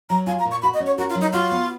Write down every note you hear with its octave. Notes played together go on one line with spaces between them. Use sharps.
F#3 A#5
F4 G#5
A#5
A#2
C#6
F#4 B5
D#5
C#4
C#5
F#4 A#4
F4
F#3
D#4
F4 F#4
B3